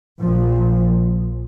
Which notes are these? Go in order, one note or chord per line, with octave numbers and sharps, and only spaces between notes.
A#1 A#2 F3